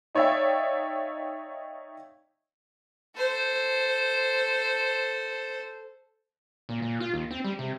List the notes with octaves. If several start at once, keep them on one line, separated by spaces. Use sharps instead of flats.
D#4 C#5 D5 E5 F5 G5
A4 C5
A#2
A#2
F4
D#2
C4
G3
C3